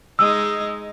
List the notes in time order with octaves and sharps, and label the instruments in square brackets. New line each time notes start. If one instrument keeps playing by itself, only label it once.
[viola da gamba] G#3 D#4 [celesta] E6